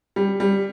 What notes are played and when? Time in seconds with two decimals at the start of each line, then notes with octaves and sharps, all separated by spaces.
0.16 G3
0.40 G3